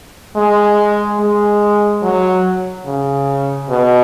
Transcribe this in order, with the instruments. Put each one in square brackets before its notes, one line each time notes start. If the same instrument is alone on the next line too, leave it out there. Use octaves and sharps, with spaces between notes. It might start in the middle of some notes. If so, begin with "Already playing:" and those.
[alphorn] G#3
G#3
F#3
C#3
B2